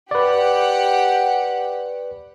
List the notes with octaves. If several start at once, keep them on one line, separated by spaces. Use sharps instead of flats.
G4 B4 D5 F#5